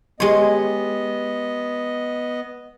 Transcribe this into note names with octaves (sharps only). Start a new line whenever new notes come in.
G#3 B3 G4 C#5 D#5 C6